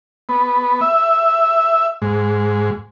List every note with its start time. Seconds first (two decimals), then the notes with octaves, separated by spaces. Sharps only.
0.29 B3
0.81 E5
2.02 G#2